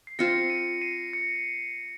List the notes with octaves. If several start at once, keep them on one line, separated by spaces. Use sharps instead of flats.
C7
C4 F4 C5 A#6 C#7
C7 D#7
C7 D#7
A#6 C#7